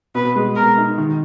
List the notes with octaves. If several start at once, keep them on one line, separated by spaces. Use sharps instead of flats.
B2 B4
G#3
B2 A#4
D#4
D#3